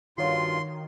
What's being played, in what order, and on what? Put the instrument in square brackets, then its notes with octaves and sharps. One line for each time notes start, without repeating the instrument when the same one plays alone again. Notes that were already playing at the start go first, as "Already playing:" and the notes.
[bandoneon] G2 F4 [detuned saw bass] D#3 [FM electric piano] F#4 C#5 F5 [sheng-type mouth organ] C6